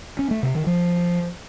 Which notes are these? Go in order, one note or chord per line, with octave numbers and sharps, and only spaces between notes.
C#4
A3
C3
D#3
F3